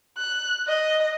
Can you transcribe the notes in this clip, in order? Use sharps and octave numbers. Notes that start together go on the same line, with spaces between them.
F#6
D#5